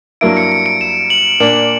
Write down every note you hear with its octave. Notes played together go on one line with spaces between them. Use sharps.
G2 F#3 A#3 E4 D7
C#7
C#7
D7
E7
F#7
A#2 A#3 D4 F#7